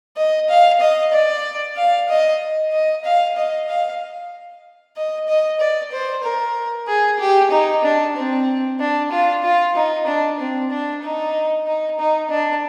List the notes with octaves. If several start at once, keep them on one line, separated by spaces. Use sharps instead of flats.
D#5
F5
D#5
D5
F5
D#5
D#5
F5
D#5
F5
D#5
D#5
D5
C5
A#4
G#4
G4
D#4
D4
C4
D4
F4
F4
D#4
D4
C4
D4
D#4
D#4
D#4
D4